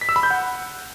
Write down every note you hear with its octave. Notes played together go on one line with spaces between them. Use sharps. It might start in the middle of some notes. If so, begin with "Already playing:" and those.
B6
E6
B5
G6
F#5